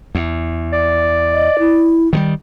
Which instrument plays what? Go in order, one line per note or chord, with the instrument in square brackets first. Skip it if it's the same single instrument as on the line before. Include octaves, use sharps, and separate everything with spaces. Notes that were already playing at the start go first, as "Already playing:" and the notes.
[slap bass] E2
[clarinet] D5
[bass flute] D#5
E4
[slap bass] D#3 E3 G3